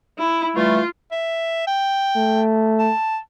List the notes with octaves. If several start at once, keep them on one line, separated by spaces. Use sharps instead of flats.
E4
E3 G3 A3 F4
E5
G5
A3
A5